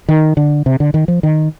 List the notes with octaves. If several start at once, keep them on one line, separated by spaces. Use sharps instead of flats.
D#3
D3
C3
D3
D#3
F3
D#3